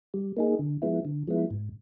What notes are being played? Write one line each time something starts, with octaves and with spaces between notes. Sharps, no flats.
G3
A#3 D#4 G#4
D3
F3 G#3 B3 E4
D3
F3 G#3 B3 E4
G#2